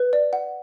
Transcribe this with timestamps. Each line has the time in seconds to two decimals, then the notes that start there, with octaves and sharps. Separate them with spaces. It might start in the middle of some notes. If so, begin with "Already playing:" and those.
Already playing: B4
0.13 D5
0.33 F#5